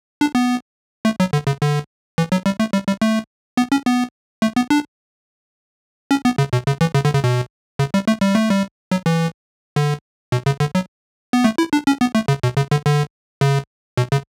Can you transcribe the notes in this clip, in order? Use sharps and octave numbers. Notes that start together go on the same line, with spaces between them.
D4
B3
A3
F#3
D3
C#3
D3
E3
F#3
G3
A3
G3
G3
A3
B3
C#4
B3
A3
B3
D4
C#4
B3
C#3
B2
C#3
E3
C#3
D3
C#3
B2
C#3
G3
A3
G3
A3
G3
F#3
E3
D3
B2
C#3
D3
F#3
B3
A3
E4
D4
C#4
B3
A3
C#3
B2
C#3
D3
D3
C#3
B2
C#3